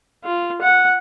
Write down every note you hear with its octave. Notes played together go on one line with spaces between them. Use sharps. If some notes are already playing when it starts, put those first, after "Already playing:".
F4
F#5